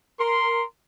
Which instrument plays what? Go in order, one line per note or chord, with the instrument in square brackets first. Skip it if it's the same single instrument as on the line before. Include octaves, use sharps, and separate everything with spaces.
[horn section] A#4 C6